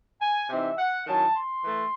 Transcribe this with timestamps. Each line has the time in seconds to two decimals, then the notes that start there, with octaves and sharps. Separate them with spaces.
0.21 G#5
0.49 C3 E3 C4 D#4 E5
0.78 F#5
1.06 D#3 F#3 C#4 E4 A5
1.35 C6
1.63 E3 A3